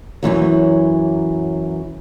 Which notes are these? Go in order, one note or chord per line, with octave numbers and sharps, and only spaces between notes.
F#2 B2 E3 F#3